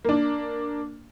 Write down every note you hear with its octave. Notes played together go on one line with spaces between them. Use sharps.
A#3 D4